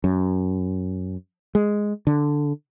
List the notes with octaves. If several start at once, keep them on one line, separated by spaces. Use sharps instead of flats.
F#2
G#3
D3